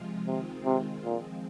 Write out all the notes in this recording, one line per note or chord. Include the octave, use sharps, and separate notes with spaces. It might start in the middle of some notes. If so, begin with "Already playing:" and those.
Already playing: C3 F3 G#3 F4
C3 D#3 G#3 C4 F4
C3
A#2 F3 G#3 C4